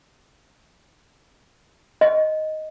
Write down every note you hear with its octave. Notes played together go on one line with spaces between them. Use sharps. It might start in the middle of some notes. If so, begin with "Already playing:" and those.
D#5